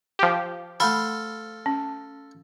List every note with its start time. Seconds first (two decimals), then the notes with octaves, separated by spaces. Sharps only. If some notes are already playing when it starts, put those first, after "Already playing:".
0.19 F3 G4
0.80 A3 A4 F5 B5 C6
1.66 C#4